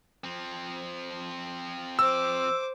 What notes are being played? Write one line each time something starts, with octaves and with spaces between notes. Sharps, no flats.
F3 C4
C5 D6 E6